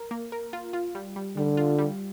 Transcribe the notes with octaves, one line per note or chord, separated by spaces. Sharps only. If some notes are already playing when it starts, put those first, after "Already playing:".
Already playing: A#4
A#3
A#4
F4
F4
G3
G3
D3 G3
F4
G3